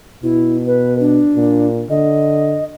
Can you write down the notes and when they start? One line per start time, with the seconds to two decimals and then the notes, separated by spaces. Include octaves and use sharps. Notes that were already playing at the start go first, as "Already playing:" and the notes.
0.23 B2 E4
0.67 B4
1.00 D4
1.35 A#2
1.90 D3 D#5